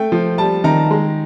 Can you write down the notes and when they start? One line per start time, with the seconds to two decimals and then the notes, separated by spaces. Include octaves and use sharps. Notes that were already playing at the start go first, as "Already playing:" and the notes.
Already playing: A3 G5
0.12 F3
0.38 G3 A5
0.64 D#3 A#5
0.91 G#3